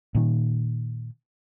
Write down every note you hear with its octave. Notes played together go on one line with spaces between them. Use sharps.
A#2 D#3